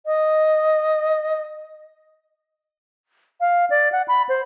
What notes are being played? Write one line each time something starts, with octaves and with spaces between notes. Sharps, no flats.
D#5
F5
D5
F#5
B5
C5